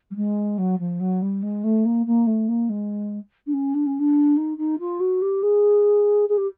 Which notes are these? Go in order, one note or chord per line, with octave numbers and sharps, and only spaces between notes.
G3
G#3
F#3
F3
F#3
G3
G#3
A3
A#3
A#3
A3
A#3
G#3
D4
C#4
D4
C#4
D4
D#4
D#4
F4
F#4
G4
G#4
G#4
G4